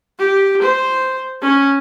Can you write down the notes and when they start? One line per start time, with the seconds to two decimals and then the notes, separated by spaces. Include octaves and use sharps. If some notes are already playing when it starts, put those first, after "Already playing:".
0.19 G4
0.62 C5
1.42 C#4